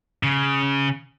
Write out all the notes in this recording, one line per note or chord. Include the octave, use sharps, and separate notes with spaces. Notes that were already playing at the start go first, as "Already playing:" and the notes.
C#3